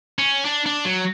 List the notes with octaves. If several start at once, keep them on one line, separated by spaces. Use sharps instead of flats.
C#4
D4
D4
F#3